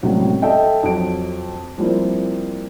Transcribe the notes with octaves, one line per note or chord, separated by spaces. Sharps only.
C#2 A2 C3 F#3 G3
A4 D#5 E5 G5
F2 F#3 D7
F3 G3 A#3 C4 E4